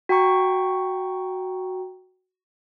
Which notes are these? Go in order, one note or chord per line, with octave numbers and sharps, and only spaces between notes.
F#4 G5 A#5 C#6